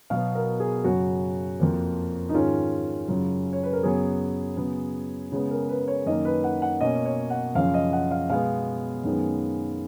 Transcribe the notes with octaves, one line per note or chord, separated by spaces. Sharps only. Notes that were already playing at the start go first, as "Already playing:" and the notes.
B2 F#3 B3 F5
A#4
G#4
F#2 C#3 F#3 F#4
F2 F3 A#3
D#4
G#2 D#3 G#3 C#4 F4
F#2 C#3 F#3
C#5
B4
A#4
F#2 C#3 F#3 B3 G#4
C#3 F#3 B3
C#3 G#3 B3
A#4
B4
C#5
F#2 D#3 A#3 D#5
B4
F#5
F#5
B2 A#3 C#4 D#5
C#5
F#5
F#2 C#3 F3 F5
D#5
F#5
F5
B2 G#3 B3 F5
F#2 D#3 G#3 B3